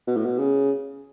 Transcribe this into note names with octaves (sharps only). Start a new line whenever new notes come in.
B2
A2
B2
C#3